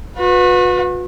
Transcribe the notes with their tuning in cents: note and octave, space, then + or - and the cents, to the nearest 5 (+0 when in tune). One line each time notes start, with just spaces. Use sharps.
F#4 -40 B4 +0